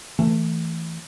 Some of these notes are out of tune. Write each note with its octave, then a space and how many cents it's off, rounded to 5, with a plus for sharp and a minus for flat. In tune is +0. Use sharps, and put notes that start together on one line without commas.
E3 +0 A3 +15